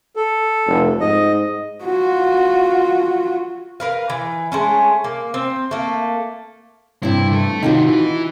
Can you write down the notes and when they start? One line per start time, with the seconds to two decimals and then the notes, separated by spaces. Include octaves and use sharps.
0.16 A4
0.66 F1
1.00 G#2 D#5
1.83 F4 F#4
3.80 A#4 B4 F5
4.10 E3
4.52 G#3 A3 C#4
5.04 A#3
5.34 C4
5.71 A3 A#3
7.03 G2 C3 E4
7.32 A3 A4
7.63 C3 D#3 D#4 F4 F#4
7.86 E3 E4